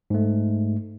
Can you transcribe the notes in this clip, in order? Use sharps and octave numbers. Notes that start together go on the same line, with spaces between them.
G#2 A3